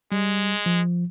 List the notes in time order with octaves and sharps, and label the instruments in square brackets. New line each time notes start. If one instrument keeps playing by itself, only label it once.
[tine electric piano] G3 [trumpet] G#3
[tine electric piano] F3